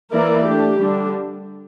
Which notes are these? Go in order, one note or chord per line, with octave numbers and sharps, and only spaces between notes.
E3 A#3 E4 A#4 D5
A3 D4 G4
D3 G3 D4